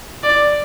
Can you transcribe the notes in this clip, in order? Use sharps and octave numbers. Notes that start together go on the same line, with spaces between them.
D5